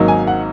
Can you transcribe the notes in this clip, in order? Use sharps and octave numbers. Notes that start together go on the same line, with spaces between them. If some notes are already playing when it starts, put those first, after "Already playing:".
Already playing: G#1 G#2 F#3 A#3 D#4
G#5
F#5